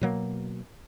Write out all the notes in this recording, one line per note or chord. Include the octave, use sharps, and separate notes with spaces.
B2 F#3 A#3